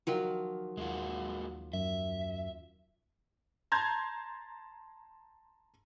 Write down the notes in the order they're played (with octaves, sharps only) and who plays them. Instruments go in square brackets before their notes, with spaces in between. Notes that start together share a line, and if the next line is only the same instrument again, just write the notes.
[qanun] D#3 F3 F#3
[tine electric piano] D#2 F4 [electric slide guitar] G#3 A#3 F#4
[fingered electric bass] F#2 [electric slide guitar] E5
[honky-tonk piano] A5 A#5 C6 G6 G#6